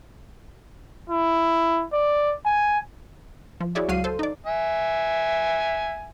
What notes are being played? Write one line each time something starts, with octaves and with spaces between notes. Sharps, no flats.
E4
D5
G#5
F3
E4 F#4 G#4 C#5 D5 E5
C#2 F#3 F#4 F5 C7 D#7
A4 C5
D#4 D5
E5 G#5